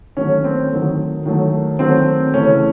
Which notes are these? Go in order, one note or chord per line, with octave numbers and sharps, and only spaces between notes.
D#3 F#3 A3 C#4
C4
D#3 F#3 A3
D#3 F#3 A3
D#3 F#3 A3 C4
C#3 E3 A3 C#4